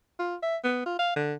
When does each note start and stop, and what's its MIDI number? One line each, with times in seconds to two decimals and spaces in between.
0.19 0.36 65
0.43 0.57 76
0.64 0.81 59
0.86 0.96 65
0.99 1.13 77
1.16 1.34 50